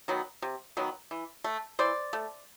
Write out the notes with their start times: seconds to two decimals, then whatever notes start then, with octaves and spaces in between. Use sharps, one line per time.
0.08 D#3 F#3 B3
0.42 C3
0.77 D#3 F#3 B3
1.11 E3
1.44 A3
1.79 E3 C5 D5
2.13 A3